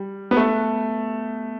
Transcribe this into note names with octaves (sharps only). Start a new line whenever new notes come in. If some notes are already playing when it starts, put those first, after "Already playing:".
Already playing: G3
B3
A3